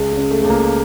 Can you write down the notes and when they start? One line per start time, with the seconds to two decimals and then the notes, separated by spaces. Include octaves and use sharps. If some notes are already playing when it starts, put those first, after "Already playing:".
Already playing: C#2 G#3
0.11 G#3
0.17 C#3
0.31 A3
0.42 C#2 A3
0.50 A#3